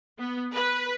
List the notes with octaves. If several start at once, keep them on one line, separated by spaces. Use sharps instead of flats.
B3
B4